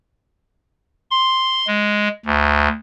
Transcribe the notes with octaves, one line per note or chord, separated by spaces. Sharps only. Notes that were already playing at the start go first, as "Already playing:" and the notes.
C6
G#3
D2